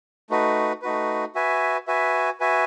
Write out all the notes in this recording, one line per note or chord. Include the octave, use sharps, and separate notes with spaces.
A3 D#4 F#4 B4
A3 D#4 F#4 B4
F#4 B4 E5 G#5
F#4 B4 E5 G#5
F#4 B4 E5 G#5